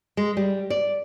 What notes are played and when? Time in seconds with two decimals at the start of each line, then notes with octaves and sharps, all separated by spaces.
0.17 G#3
0.37 G3
0.70 D5